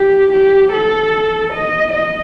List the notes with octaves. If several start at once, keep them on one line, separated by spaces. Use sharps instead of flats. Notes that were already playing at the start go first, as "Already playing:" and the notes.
Already playing: G4
G4
A4
D#5
D#5